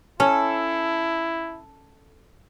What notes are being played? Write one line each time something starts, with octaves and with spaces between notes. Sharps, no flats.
C#4 E4 A4